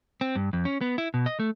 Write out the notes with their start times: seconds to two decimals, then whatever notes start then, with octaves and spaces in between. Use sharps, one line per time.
0.21 C4
0.36 G2
0.53 F2
0.65 C#4
0.81 B3
0.98 E4
1.14 B2
1.26 D#5
1.40 A3